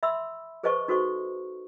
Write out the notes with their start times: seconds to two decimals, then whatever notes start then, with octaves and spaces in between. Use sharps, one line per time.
0.03 E5 B5 C6 E6
0.63 G#4 B4 C5 D#5 A5 C#6
0.88 D#4 F#4 A4 C5 C#6